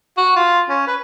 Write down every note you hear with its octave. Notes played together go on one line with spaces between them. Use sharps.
F#4
F4
C#4
B4